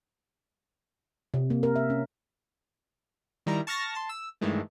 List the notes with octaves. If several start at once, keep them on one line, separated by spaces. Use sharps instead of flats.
C3
A#3
A#4
E5
C#4
D#3 G3 E4 A#5
A5 C#6 F6 A6 A#6
A5 C6
E6
G2 D#3 E3 G#3 A3